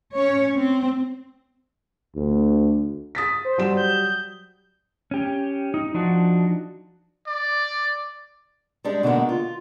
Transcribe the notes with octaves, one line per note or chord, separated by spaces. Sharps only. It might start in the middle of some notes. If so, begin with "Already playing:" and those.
C#4 C#5
C4
D2
D#6 A6 B6
C5
F#3 G3 E7
G6
C#4 G4
D#4
F3 D4 D#4 F#4
D5
G3 G#3 D4
B2 D3 D#3 G#3 A#3
F4